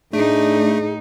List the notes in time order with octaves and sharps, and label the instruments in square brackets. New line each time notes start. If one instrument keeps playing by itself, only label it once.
[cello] A2 D#4 [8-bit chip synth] A3 [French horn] D4 [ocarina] G#4